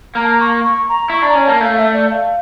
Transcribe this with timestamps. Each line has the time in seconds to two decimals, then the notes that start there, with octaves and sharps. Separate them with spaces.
0.15 A#3 A#5
0.23 A5
0.31 A#5
0.40 C#6
0.64 C#6
0.89 A#5
1.10 E4 C#6
1.22 D4
1.29 A#5
1.35 C#4
1.45 A#3 A5
1.61 A3 F5
1.77 E5
1.94 D5
2.10 F5